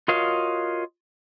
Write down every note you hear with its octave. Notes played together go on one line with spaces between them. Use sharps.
F4 F#4 A#4 C#5 D#5 F5